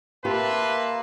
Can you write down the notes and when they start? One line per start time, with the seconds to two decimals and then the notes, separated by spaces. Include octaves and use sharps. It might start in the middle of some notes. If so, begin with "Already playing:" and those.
0.25 A#3 G4 B4 E5 A5 C6